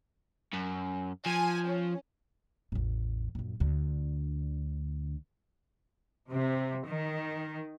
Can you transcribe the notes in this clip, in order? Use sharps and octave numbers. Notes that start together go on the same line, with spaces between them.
F#2
F3 G#5
C#4
A1 E2
A#1 F#2
D2 D3
C3
D#3